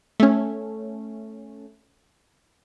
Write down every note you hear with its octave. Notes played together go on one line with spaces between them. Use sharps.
A3 C#4